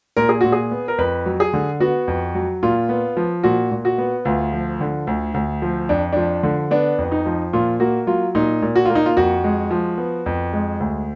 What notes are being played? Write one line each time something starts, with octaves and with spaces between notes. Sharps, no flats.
A#2 A#4
G#4
A#2 F#4
G#4
B3
A#4
F2 B4
F#3
G#4
D3
B3 F#4
F2
F#3
A#2 F4
B3
F3
A#2 F#4
A#2
F#4
B3
D2 F4
F3
D3
D2
D2
F3
F2 D4
F3 D4
D3
B3 D4
F2
D#4
F3
A#2 F4
A#3 F#4
F#3 F4
A#2 D#4
A#2
F#4
A#3 F4
D#4
F4
F2 F#4
G#3
F3
B3
F2
G#3
D2